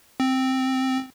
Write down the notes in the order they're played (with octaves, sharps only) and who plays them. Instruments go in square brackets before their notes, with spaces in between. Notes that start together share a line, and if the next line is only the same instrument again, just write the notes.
[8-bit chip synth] C4